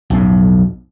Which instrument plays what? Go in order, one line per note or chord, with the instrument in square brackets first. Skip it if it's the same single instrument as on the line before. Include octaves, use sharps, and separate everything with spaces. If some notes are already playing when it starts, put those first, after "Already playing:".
[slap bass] B1 F2 A2